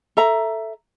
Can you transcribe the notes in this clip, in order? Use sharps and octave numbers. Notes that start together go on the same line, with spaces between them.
A4 E5 A#5